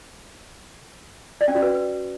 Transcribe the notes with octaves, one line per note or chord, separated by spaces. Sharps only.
D5
C#4
F#4
B4